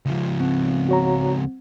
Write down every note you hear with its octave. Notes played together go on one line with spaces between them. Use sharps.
C#2 F3
C4
F#4 C#5 A#5